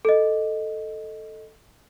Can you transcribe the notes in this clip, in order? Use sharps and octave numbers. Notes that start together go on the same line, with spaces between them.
A4 D#5